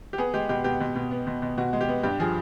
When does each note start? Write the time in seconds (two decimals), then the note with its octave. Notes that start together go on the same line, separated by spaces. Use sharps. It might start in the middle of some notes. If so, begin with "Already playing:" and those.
0.13 G4
0.18 B3 G#4
0.34 G#3 G4
0.49 B2 G4
0.64 B2 G4
0.80 B2
0.96 B2
1.11 B3
1.27 B2
1.42 B2
1.58 B2 F#4
1.73 G#3
1.81 G4
1.88 B3
2.03 G2 G4
2.20 F3 G#4